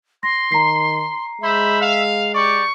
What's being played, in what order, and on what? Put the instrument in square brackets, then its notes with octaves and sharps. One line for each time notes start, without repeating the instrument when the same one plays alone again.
[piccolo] C6 [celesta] A#6
[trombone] D#3 [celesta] A#5 C7
[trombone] G#3 [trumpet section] C5 B5 [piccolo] E5
[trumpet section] F5
[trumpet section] G4 D5 [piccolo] C#6